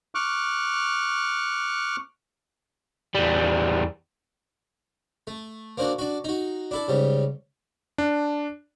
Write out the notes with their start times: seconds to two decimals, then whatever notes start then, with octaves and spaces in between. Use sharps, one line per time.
0.15 C#6 D6 F6 F#6
3.15 E2 G3
5.27 A3
5.78 A#3 C4 D4 F#4
5.99 D4 F#4
6.24 D#4 F#4
6.71 D4 E4 A4
6.88 G#2 C#3 G3
7.98 D4